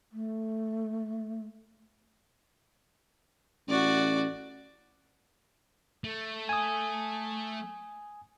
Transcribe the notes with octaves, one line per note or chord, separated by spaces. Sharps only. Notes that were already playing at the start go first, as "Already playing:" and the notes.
A3
A1 F#4 D5
A3
G#5 D#6